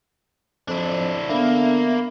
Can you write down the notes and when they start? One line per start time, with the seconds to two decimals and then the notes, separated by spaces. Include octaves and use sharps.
0.68 F2 D4 E4
1.29 D3 A#3 B3 E5